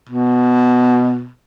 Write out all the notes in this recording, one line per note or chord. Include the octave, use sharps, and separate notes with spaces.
B2